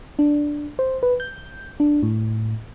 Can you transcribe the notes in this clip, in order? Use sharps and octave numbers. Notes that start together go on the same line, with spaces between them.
D4
C5
B4
G6
D4
A2